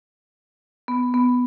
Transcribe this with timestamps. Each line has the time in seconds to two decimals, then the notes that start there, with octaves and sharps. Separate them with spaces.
0.88 B3
1.14 B3